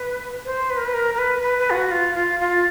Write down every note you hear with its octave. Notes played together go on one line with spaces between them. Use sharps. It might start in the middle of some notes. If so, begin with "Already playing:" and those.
Already playing: B4
C5
B4
A#4
B4
A#4
A#4
B4
B4
B4
F4
F#4
F4
F4
F4